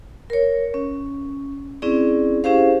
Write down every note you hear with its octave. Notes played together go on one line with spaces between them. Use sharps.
A#4 C#5
C#4
C4 C#4 E4 G#4 D5
C#4 E4 G4 G#4 C5 F5